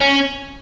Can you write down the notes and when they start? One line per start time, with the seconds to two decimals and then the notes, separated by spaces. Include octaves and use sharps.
0.01 C#4